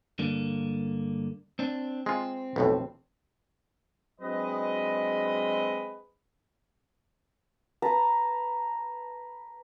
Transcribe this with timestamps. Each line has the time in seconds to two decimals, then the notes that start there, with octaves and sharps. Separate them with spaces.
0.19 G2 D3 A#3
1.59 C4 D4
2.06 G#3 C4 F4
2.56 B1 F2 A2
4.20 F#3 G#3 C4 D4 B4 D#5
7.82 B4 A5 A#5